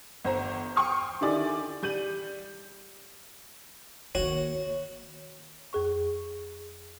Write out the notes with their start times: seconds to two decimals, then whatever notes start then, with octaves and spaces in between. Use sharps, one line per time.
0.24 G1 C5 A#5
0.76 G5 C6 C#6 D#6 F6
1.21 D3 D#3 E4 G4 D5 G#5
1.83 G3 G6 D#7 F#7
4.15 D#3 A#3 F#4 C#5
5.73 F2 G#4 C#6